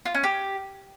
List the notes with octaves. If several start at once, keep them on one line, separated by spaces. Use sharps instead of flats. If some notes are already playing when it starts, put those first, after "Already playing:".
F4
C#4
G4